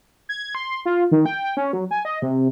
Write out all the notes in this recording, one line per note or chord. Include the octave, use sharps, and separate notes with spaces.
G#6
C6
F4
D#3
G5
G5
C#4
F#3
G#5
D#5
C3